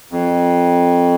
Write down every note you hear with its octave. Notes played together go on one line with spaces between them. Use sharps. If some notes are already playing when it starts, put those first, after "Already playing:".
F2